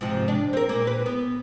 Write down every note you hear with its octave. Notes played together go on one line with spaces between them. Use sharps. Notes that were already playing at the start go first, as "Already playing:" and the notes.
G#2 C3 F3
D4
C4 A#4
A#2 A#3
B4
B3